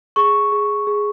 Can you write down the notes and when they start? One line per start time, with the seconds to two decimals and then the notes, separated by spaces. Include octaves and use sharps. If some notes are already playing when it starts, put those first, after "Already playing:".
0.16 G#4 C#6
0.52 G#4
0.87 G#4